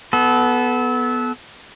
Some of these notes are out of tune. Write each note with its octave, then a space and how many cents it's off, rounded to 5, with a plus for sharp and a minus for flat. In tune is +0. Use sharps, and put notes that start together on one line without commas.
B3 +0 A4 -25